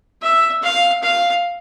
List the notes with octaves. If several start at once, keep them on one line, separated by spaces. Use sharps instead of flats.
E5
F5
F5